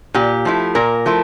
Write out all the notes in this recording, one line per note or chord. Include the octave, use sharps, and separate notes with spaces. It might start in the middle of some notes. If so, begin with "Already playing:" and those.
A#2 G4
F3 A3 E4
A#2 A#4
F3 A3 E4